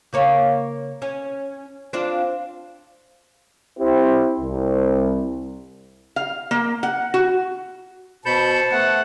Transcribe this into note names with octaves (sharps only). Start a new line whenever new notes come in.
C#3 A#3 C#5
C#4
C4 D4 F4
C4 E4 G4 C5
C2
F5
A#3
F#5
F#4
B2 C5 A5 B5 G6 C#7
A3 B3 F#5